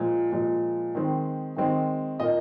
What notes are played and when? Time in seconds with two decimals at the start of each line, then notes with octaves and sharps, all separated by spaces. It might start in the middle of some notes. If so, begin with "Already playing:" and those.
Already playing: A#2 F3 G#3 C5
0.32 A#2 F3 G#3
0.95 D#3 G#3 C4
1.56 D#3 G#3 C4
2.19 A#2 A#3 D#5